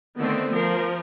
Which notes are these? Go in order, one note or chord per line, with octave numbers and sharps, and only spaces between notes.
D3 D#3 A3 B3 C4
F3 A#4